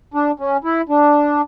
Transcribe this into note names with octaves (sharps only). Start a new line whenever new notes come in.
D4
C#4
E4
D4